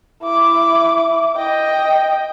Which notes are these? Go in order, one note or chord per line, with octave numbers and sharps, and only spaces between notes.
E4 D6
D#5 G5